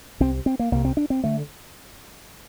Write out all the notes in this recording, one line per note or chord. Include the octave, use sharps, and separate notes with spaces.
C2 C3 C4
C4
A#3
C2 C3 A#3
C4
D4
C4
D3 A3